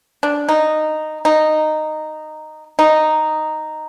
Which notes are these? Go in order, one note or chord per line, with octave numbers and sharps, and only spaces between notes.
D4
D#4
D#4
D#4